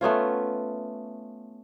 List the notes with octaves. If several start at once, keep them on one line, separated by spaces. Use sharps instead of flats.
A3 B3 C#4 F4